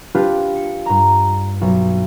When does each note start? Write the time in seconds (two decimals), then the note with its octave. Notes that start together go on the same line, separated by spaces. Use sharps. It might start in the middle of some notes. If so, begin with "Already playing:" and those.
0.15 D4 F4 G4 B4
0.56 C#7
0.86 G2 A#5
1.61 B1